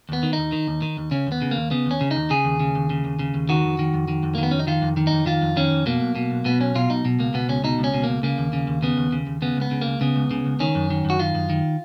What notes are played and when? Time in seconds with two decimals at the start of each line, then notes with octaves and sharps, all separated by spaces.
0.09 D#2 B3
0.23 D#3
0.33 D#2 D#4
0.52 D#3
0.67 D#2
0.82 D#3
0.97 D#2
1.11 C#3 C#4
1.27 D#2 B3
1.42 C#3
1.51 D#2 A#3
1.71 C#3 B3
1.86 D#2 C#4
2.01 C#3
2.11 D#2 D#4
2.30 C#3 G#4
2.45 D#2
2.60 C#3
2.75 D#2
2.90 C#3
3.05 D#2
3.19 C#3
3.34 D#2
3.49 D#3 F#4
3.64 F2
3.79 D#3
3.94 F2
4.08 D#3
4.23 F2
4.35 A#3
4.38 D#3 B3
4.51 F2 C#4
4.59 D#4
4.67 D#3 F4
4.82 F2
4.97 D#3
5.07 D#4
5.12 F2
5.26 D#3 F4
5.42 F2
5.57 D#3 C#4
5.71 F2
5.86 B2 A#3
6.01 B1
6.16 B2
6.31 B1
6.45 B2 B3
6.60 B1 C#4
6.75 B2 F4
6.90 B1 D#4
7.05 B2
7.19 C#2 A#3
7.34 B2 B3
7.49 C#2 C#4
7.64 B2 D#4
7.79 C#2 C#4
7.94 B2
8.04 A#3
8.09 C#2
8.23 C#3 A#3
8.38 D#2
8.53 C#3
8.67 D#2
8.83 C#3 B3
8.97 D#2
9.12 C#3
9.27 D#2
9.42 C#3 B3
9.57 C#2 B3
9.71 C#3
9.81 A#3
9.87 C#2
10.01 C#3 B3
10.16 C#2
10.31 C#3
10.46 C#2
10.60 D#3 C#4
10.75 F#2
10.90 D#3
11.05 F#2 F#4
11.20 D#3 F4
11.35 F#2
11.50 D#3